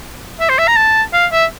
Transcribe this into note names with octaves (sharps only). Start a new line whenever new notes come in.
E5
C5
E5
A#5
A5
F5
E5